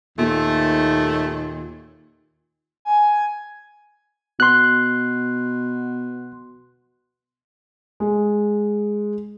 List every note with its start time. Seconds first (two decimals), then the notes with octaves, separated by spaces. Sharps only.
0.18 D#2 A#2 A3
2.85 G#5
4.40 B2 C6 F#6
8.00 G#3